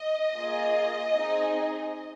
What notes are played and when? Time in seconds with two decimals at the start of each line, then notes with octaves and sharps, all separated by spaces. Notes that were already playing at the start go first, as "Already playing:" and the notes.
Already playing: D#5
0.35 A#3 F4 G#4
1.15 C4 D#4 G#4